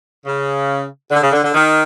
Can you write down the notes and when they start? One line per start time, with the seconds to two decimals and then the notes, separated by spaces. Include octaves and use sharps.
0.25 C#3
1.10 D3
1.20 C#3
1.31 D3
1.42 D3
1.52 D#3